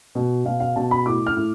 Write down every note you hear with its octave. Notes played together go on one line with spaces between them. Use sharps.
B2
B2 F5
F5
B2 A5
B5
A2 D6
F6
A2